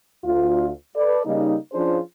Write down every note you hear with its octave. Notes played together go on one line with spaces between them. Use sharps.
D2 F4
A4 B4 D5
C#3 G3 A#3 D#4
F3 C#4 D4 F4 G#4 C5